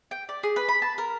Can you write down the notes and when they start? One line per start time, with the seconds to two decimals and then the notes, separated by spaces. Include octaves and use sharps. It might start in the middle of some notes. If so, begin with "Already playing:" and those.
0.11 G5
0.29 D5
0.43 G#4
0.56 B4
0.68 B5
0.82 A5
0.98 A#4